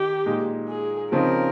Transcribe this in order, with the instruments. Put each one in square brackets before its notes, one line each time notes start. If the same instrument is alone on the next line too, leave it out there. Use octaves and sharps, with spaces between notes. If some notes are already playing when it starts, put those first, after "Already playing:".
Already playing: [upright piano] D#3 D#4 [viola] G4
[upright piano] A#2 G#3 D#4
[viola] G#4
[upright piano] C#3 F3 C4 D#4 [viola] A#4